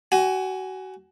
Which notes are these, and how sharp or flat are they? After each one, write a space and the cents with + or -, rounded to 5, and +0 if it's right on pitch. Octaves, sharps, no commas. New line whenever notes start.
F#4 +30 G#5 +0